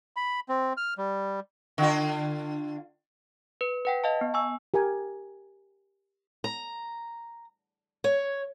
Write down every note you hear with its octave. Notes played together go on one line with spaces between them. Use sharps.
B5
C4
F6
G3
D3 F4
B4
B4 F#5 G5
D#5 F5 A5
B3
G#5 C#6 E6
G4 A#4 G5 G#5
A#5
C#5